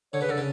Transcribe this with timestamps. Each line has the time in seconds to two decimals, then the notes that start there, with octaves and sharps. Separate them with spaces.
0.13 D3 C#5
0.21 C#3 B4
0.29 D3 A4
0.37 C#3